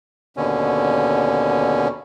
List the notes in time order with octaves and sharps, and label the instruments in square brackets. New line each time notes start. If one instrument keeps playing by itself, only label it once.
[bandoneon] D#2 B2 D3 C#4